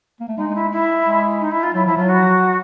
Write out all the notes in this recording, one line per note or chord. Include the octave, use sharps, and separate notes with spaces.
A#3
A3
G#3 D#4
D#4
E4
E4
G#3
D#4
E4
F4
F#3 E4
F3 E4
F#3 F4
F#4